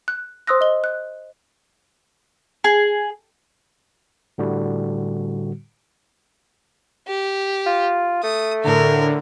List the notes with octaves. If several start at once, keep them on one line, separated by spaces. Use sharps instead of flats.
F#6
C5 C6 D#6 E6 F#6 A#6
D#5 G7
F#6
G#4
A2 D3 G3 F#4
G4
F4
A3 D#6
A2 D3 A#4